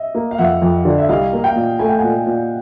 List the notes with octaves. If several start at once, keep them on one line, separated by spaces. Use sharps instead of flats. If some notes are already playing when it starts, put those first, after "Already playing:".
Already playing: D#5 E5
A#3
F5
F2 E5 F#5
F2
D3
E5
C2 D#5 F5
A#3
F5 G5
A#2
A3 G#5
G5
A#2 F#5 G#5
A#2